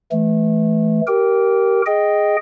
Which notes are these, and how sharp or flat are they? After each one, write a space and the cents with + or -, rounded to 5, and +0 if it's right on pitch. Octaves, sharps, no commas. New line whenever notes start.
E3 +0 A3 -20
G4 -20 A#4 +0 G5 +0
G#4 +0 D#5 +0 G5 +0